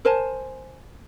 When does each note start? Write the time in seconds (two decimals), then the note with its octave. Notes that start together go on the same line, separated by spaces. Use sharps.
0.05 A#4 C5 G#5 A5